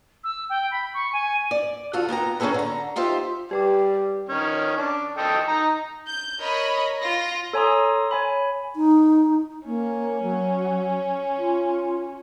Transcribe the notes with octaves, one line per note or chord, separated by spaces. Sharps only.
E6
G5
B5
C#6
G#5
D5
D2 F4 F#4 A4 F5
A#3 B3 G5 A#5
D#3 C#4 D#4 G#4 A4 B4
D3 A#5
D#4 F4 G4 C5 E5
G3 G4 B4 D6
D#3 C#4
D4
A4 D#5 G5
D#4 A#5
G6
A#4 C#5 D#5 B5
F4 A#6
A4 C#5 G#5 A#5 C6 D#6
C#5 G#5 B5
D#4
A#3 C#4
F#3
F4